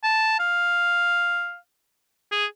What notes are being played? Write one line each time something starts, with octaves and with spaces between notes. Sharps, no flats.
A5
F5
G#4